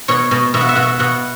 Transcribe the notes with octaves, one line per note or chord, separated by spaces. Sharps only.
B2 C#5
B2
B2 E5
F#5
E5
B2 F#5
E5
B2 F#5